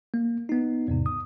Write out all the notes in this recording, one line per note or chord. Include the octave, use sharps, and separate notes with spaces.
A#3
B3 D#4
E2 G#2 C3
D#6